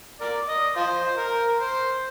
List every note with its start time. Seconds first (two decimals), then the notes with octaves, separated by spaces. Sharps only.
0.21 A#4 D5
0.48 D#5
0.76 F4 C5
1.18 A#4
1.60 C5